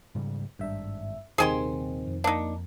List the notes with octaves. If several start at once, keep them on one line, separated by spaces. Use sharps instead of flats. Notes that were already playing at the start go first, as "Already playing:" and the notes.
G#2 C#3 G3
G#1 G2 D4 E5
D#1 C3 D#3 C4 G#4 G#5 C6
F2
A#3 D4 D#4